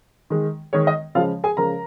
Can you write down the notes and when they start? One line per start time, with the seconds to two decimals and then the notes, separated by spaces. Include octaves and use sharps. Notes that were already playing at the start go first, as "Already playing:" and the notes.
0.30 D#3 G#3
0.73 D#3 G#3 C#5
0.87 D#5
1.15 C#3 F3 G#3 F4 F5
1.44 G#4 G#5
1.57 C#3 F3 G#3 A#4 A#5